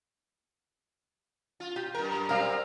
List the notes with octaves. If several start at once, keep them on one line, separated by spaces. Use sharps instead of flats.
F4
G4
F#2 A#4
G3 C4 A#4 F5